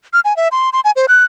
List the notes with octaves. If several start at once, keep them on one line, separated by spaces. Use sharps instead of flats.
F6
G#5
E5
C6
C6
G#5
C5
F#6